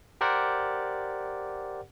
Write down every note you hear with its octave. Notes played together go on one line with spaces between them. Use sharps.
G4 A#4 C5 D5 F#5